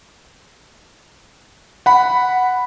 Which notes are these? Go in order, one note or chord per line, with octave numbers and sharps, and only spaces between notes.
F#5 B5